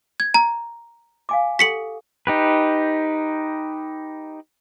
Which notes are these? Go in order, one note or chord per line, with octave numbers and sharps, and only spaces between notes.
G#6
A#5
F5 G#5 D6
G4 A4 F#5 B6 C#7 F#7
D#4 G4 B4